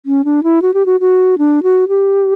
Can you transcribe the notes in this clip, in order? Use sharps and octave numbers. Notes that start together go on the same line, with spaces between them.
C#4
D4
E4
F#4
G4
F#4
F#4
D4
F#4
G4